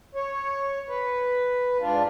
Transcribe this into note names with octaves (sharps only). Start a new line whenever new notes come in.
C#5
B4
G#2 D4 F4